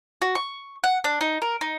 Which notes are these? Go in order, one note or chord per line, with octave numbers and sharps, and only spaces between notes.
F#4
C#6
F#5
D4
D#4
A#4
D#4